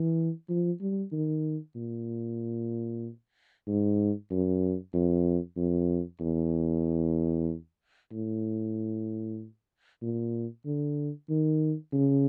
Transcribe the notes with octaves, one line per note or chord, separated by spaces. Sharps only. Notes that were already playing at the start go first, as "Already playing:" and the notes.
Already playing: E3
F3
G3
D#3
A#2
G#2
F#2
F2
F2
E2
A2
A#2
D3
D#3
C#3